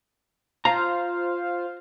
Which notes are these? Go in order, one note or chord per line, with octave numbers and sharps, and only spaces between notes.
F4 C5 F5 A#5